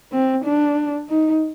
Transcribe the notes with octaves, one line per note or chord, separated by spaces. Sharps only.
C4
D4
D#4